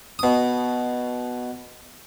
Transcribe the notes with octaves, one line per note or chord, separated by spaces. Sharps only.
B2 D#6